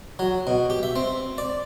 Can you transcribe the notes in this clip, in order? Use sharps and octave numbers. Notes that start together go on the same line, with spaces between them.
F#3
B2
G4
E5
C4
D5